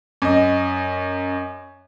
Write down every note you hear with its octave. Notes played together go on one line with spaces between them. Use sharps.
F#2 D#5